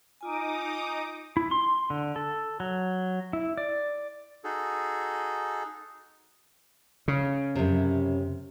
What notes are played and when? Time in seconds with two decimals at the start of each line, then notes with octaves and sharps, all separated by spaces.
0.21 D#4 F4 G#5 D6 D#6
1.37 E4
1.51 C6
1.90 D3
2.16 A4
2.60 F#3
3.33 E4
3.58 D5
4.44 D#4 F#4 G#4 A4
7.08 C#3
7.55 F#2 C3